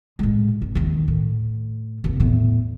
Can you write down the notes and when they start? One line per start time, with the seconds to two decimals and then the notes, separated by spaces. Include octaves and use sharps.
0.19 A2 G#3
0.61 G#1
0.75 D#2 D#3
1.08 A2
2.04 D#2 C3
2.20 E2 A2